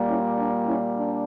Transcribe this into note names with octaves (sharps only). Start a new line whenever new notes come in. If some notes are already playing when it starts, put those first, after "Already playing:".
Already playing: A#2 G3 A#3
C#4 E4
D4
C#4 E4
D4